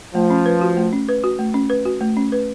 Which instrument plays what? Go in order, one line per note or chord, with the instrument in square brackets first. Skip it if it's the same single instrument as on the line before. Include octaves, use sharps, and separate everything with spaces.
[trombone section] F3 [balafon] A3
[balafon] C#4
B4
F#4
A3
C#4
B4
F#4
A3
C#4
B4
F#4
A3
C#4
B4